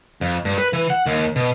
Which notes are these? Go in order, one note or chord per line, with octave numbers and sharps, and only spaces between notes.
F2
G2
B4
E3
F#5
D#2
B2